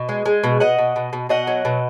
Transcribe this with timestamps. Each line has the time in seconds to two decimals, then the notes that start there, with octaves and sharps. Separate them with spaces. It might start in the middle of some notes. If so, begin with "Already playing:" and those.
Already playing: B2 D#5
0.09 G#3
0.26 G#3
0.44 B2
0.60 B2 D#5 F#5
0.78 B2
0.96 B2
1.13 B2
1.29 B2 D#5 F#5
1.47 F#3
1.65 B2